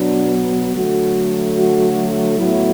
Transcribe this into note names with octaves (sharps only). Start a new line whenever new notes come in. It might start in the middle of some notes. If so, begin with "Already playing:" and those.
Already playing: B2 F#3 B3 D4
D3 F#3 A3 F#4
F#4
A2 F#3 B3 E4